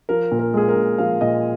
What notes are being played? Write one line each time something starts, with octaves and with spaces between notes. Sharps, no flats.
F3 A#4
A#2
A#4
G#3 G#4
A#4
A#2
F3 F5
A#2 D#5